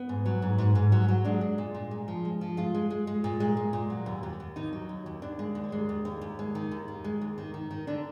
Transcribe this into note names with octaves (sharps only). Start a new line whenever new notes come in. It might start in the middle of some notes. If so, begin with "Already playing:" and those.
Already playing: B3
G#2
F#3
G#2
G#2
G#2
F#3
F#3
G#3 D4
G#3
A#2
A#2
G#3
F3
G#3
F3
G#3 F4
G#3
G#3
G#3
A#2
G#3
G#3
A#2
F#3
D#2
D#2
D#2
D#3 D#4
F#3
D#2
D#2
D#2 D4
G#3
D#2
G#3
D#2
D#2
D#2
G#3
D#3
D#2
D#3
G#3
D#2
D#3
D#3
D#3
D3 D4